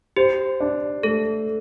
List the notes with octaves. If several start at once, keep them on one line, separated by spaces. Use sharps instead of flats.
G4 C5
D4
A3 A4